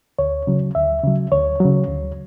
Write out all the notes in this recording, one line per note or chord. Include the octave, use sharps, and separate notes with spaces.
D2 C#5
C#3 F#3
D2 E5
C#3 F#3
D2 C#5
C#3 F#3
D2